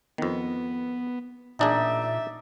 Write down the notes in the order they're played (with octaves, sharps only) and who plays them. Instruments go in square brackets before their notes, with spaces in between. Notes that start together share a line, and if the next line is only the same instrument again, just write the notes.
[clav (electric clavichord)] F2 D#3 [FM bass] B3
[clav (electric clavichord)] A1 D4 G#4 [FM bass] A#2 [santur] D#4 D5 [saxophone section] E5